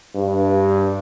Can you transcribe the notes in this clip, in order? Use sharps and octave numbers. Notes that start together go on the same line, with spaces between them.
G2